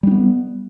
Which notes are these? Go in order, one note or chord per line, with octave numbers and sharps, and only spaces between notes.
G3 B3 D4